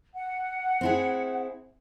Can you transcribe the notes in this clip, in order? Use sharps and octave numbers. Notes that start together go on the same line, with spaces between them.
F#5
C4 E4 G#4